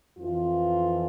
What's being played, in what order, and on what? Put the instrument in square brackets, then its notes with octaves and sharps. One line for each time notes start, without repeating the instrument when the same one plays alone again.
[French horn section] F2 E3 F4